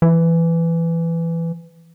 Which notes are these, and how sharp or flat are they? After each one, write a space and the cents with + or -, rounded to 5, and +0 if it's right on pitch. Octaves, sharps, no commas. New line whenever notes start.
E3 +15